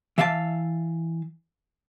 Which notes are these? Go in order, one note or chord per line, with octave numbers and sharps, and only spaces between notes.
E3 E5 F5 G5 A5